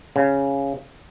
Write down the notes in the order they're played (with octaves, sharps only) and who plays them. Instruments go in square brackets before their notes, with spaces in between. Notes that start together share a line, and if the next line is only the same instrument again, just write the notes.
[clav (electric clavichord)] C#3